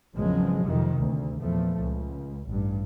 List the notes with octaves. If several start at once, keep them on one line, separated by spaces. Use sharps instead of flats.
G#1 E2 C#3 F3 F#3 G#3
F2 C3 D#3
D2
E2 A#2 F3 A3
C#2
A1 G2